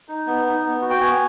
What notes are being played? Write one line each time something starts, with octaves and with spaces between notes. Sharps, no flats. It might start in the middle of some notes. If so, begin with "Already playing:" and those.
D#4
B3
D#4
B3
F#4
G5
B3 G#5